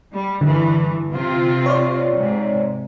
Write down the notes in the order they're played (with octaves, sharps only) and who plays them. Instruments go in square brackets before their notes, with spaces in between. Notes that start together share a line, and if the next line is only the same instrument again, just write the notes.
[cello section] G3
[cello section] G2 E3 [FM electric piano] D3
[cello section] C3 C4 F4
[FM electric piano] C#5 D5
[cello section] G#2 C3